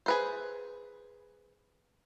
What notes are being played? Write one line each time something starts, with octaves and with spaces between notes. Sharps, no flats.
G#4 B4 C5